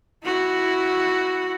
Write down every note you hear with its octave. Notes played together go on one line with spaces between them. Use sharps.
E4 F#4